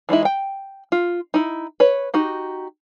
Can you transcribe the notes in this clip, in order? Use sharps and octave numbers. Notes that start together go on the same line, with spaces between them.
E3 G#3 D#4 E4
G5
F4
D#4 E4
B4 C#5
D#4 F#4 G4